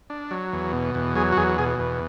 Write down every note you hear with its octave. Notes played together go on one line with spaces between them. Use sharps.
D4
F#3
E2
B2
E2
F#3 G#4
F#4
E2 G#4
B2 G#4
E2